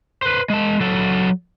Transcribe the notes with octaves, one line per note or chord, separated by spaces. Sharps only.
B4 C5
G#3 A5
F#3 A4